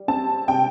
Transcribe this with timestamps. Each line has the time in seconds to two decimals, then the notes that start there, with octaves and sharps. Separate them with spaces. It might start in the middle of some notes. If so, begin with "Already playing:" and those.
Already playing: G3
0.08 C4 A5
0.48 C3 G5